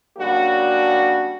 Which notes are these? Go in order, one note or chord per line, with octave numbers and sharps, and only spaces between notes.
C#3 F#3 G3 A#3 D4 F#4